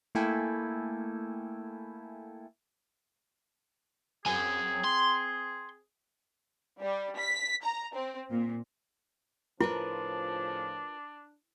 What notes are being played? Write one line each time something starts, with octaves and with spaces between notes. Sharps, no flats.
A3 A#3 E4 A4 G5 G#5
F#3 C4 G#4 G#5
C6
G3
B6
A#5
C4
A#2
A2 C#3 F3 D4 E4 F4 A#4 B4